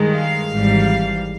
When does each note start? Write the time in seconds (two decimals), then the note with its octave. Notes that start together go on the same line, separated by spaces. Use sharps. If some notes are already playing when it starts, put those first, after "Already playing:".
Already playing: G2 D#3 G#3
0.15 F5
0.51 G#1 G#2 E3 G3